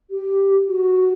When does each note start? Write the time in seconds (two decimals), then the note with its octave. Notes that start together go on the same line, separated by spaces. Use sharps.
0.10 G4
0.68 F#4